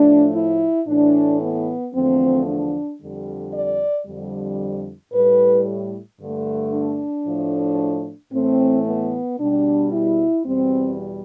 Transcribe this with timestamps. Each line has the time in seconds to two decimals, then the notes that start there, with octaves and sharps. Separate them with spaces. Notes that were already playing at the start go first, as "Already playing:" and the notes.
Already playing: A2 F3 A3 D4
0.34 E4
0.88 A2 E3 A3 D4
1.41 B3
1.94 E2 D3 F3 A3 C4
2.47 D4
3.01 F2 D3 G3
3.54 D5
4.07 F2 D3 G3
5.13 A2 G3 B4
6.20 G2 D3 A3
6.74 D4
7.26 A2 F3 A3
8.33 A2 E3 A3 C4
8.87 B3
9.39 B2 G3 D4
9.93 E4
10.46 E2 B2 G3 C4